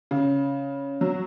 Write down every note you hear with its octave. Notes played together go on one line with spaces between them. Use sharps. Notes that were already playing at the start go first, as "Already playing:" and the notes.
C#3
F#3